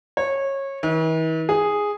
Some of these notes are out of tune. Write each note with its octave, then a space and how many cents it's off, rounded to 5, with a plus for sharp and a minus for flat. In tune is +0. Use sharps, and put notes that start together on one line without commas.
C#5 -20
E3 -45
G#4 -5